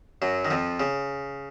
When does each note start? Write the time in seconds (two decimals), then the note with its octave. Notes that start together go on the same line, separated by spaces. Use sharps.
0.22 F#2 F#3
0.45 D#3
0.50 F2 F3
0.80 C#3